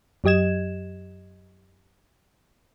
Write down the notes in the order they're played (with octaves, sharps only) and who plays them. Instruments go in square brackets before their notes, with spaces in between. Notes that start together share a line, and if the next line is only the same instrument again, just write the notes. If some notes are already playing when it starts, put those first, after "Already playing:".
[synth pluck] F#2 F#3 G4 D#5 G#6 E7